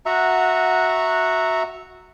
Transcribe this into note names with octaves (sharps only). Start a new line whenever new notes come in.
F#4 E5 F#5 A#5